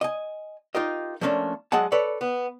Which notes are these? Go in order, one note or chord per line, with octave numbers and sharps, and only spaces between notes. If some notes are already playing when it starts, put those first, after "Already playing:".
D#5 G#5
D#4 F4 G4 A#4 D#5
F3 A3 A#3 C#4 D4
F#3 G#3 D#5 F#5 A5
A4 B4 C#5 D5 B5
B3